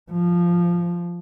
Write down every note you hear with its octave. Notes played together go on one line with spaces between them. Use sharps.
F3